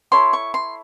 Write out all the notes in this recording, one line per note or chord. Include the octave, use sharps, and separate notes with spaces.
E4 A4 C#5 C6
C#6
C6